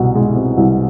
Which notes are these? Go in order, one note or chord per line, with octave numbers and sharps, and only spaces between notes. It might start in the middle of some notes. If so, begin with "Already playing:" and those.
Already playing: C2 B2
G#3
C4
C2